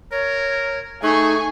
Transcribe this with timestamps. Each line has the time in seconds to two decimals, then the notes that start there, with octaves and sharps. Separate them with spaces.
0.12 A#4 C#5
1.03 A3 D#4 G#4 G#5 C#6